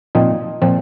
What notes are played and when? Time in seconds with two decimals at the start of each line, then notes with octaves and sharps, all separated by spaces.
0.15 A#2 F3 C4 D#4
0.62 A#2 F3 C4